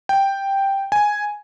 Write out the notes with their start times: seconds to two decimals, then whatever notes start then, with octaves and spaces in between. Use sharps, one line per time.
0.09 G5
0.92 G#5